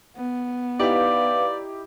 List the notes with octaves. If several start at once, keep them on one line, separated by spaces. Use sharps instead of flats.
B3
D#4 E4 G4 B4 D5 F5